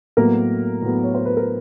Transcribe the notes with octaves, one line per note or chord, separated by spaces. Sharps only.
A2 F#3 A#3 B3 A#4
A2 F#3 B3
C#5
C5
B4
A#4